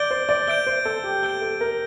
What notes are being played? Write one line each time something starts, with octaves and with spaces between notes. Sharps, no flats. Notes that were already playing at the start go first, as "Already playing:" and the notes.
Already playing: D5 G6 D7 G7
C5
D5
E5 G6 D7 G7
C5
A4
G4
A4 G6 D7 G7
A4
A#4